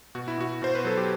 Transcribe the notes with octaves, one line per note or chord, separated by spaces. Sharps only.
B2 F#4
E4
B2 F#4
B2 C5
B4
F#3 A4
G4